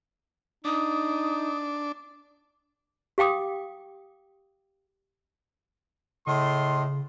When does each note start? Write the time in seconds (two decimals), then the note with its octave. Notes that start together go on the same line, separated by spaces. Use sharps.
0.65 D4 D#4 D#6
3.18 G4 F5 G5 D6 D#6
6.27 A2 C#3 D#5 C6